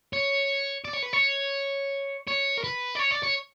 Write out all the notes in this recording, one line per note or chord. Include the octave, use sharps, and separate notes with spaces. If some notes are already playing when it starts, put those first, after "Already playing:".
C#5
D5
C#5
B4
C#5
C#5
A#4
B4
D5
C#5
D5
C#5